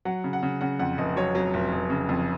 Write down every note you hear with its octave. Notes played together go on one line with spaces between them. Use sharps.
F#3 F#5
C#3
F#5
C#3
C#3 F#5
F2 F#5
F1 D#5
F#3 C#5
F#3
F1
F1
C#3
F2